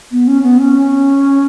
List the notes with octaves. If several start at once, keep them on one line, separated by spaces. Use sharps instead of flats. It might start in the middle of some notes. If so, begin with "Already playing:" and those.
B3
C#4
B3
C#4